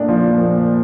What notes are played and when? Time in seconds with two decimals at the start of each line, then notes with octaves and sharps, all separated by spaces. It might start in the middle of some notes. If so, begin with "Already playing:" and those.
Already playing: A#2 A3 D4 D#4
0.08 F3
0.38 A#2